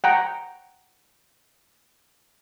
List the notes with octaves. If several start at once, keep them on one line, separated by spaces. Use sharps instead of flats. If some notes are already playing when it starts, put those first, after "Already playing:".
F#5 G5 A#5